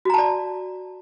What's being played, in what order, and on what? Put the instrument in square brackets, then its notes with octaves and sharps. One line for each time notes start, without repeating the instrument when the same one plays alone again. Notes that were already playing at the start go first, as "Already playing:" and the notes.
[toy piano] F#4
A#5
A5
D5